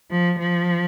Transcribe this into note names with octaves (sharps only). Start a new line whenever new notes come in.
F3
F3